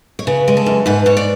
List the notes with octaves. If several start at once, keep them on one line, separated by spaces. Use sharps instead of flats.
C#5
C#3 B4
G#3
A4
F#2
G#2 B4
G#2 C#5
D5